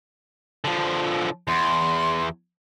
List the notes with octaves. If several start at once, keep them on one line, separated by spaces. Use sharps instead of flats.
D3 F3
E2 C6